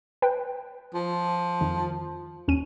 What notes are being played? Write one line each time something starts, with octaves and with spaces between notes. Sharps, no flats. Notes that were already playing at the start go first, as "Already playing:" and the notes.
B4 G5
F3
F2 D#3
D#2 C#4 D#7